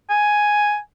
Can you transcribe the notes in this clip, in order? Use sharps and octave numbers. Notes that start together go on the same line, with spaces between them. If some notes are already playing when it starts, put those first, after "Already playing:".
G#5